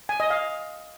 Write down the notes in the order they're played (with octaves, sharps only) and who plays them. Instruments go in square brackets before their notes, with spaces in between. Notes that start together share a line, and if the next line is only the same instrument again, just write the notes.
[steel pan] G#5
D#5
F5